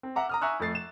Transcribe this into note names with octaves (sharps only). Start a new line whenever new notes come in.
C4
E5 F#5 A#5 D6
A#5 D#6 F6
E5 G#5 A#5 C#6 E6 F#6
F2 A3 A6 C7
E7